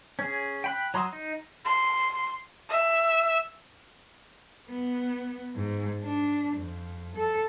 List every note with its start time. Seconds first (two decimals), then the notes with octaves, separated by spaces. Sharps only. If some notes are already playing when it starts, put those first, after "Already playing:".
0.19 C#4 G#4
0.64 G5 B5 F#6
0.94 F#3 A#5 C6 D#6 E6
1.13 D#4
1.65 C6
2.69 E5
4.69 B3
5.55 G#2
6.03 D4
6.56 F2
7.15 A4